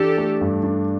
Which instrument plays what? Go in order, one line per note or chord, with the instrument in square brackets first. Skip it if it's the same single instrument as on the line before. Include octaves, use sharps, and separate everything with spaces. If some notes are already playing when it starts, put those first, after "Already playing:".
Already playing: [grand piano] E3 D4 [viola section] G4 A4
[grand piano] A3
G2
D4